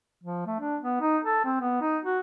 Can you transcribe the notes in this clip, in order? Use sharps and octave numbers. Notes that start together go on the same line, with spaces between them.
F3
A3
D4
B3
D#4
A4
C4
B3
D#4
F#4